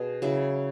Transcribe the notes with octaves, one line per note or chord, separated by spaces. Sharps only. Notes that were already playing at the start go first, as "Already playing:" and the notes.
Already playing: B2 G#4
C#3 F#3 E4